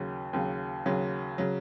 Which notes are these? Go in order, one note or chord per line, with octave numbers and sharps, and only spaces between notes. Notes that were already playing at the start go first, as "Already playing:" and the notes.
Already playing: D#2 C#3 F#3
D#2 C#3 F#3
D#2 C#3 F#3
C#3 F#3